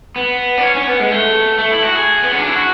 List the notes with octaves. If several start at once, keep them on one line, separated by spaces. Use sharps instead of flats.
B3
D4
C#4
C#4
B3
G#3
A3
A3
E4
F#4
G#4
B3
C#4
D4
E4
F#4